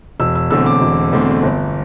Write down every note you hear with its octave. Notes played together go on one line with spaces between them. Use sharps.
E1 E6
E6
E2 D3 A3 C4 E6
D6
E1
E2 D3 A3 C4
G1